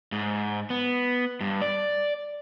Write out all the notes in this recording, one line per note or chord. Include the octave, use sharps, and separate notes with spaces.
G#2
B3
G2
D5